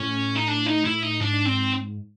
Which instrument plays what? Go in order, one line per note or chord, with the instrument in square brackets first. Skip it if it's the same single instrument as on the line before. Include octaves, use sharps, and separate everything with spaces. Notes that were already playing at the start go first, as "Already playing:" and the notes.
Already playing: [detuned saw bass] A2 [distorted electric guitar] C#4
[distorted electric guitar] D#4
D4
D#4
E4
D#4
[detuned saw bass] G#2 [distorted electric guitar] D4
[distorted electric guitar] C4